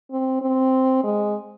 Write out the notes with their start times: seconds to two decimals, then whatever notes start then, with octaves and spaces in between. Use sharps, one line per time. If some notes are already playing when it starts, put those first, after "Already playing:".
0.11 C4
0.41 C4
1.04 G#3